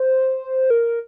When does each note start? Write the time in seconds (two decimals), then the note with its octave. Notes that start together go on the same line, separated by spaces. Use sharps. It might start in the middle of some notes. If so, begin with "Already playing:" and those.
Already playing: C5
0.70 A#4